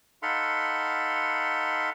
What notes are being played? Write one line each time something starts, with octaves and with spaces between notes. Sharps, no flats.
D#4 A4 F5 F#5 B5 C6